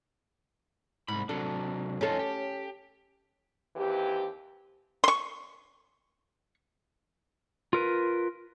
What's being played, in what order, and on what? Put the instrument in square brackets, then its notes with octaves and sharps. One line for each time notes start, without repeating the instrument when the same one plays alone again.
[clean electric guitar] C2 B5 [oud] G#2
[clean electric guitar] C3 F#3 D4 [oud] A4
[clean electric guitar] F2 D#4 F4 [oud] C#4 A4
[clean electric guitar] G4
[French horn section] D#2 E3 C4 G4
[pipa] C6 C#6
[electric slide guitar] F4 A#4 B4